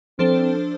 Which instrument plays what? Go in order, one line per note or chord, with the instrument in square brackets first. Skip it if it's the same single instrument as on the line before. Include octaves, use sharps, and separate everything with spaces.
[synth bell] F3 D4 A4 C5 [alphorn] C4